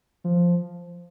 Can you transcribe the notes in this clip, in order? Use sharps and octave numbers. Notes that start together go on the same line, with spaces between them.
F3